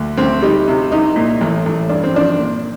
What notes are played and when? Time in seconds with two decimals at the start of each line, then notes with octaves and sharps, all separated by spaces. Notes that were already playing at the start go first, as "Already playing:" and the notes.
Already playing: D2
0.17 D2 C4
0.42 G3 D#4
0.68 C3
0.91 C2 D#4
1.16 A#2
1.41 A1
1.66 A1
1.89 G2 D4
2.03 C4
2.13 F3 D4
2.39 A#2